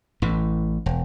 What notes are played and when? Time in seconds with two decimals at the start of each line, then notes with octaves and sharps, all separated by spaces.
0.22 A1 A2 E3
0.86 E1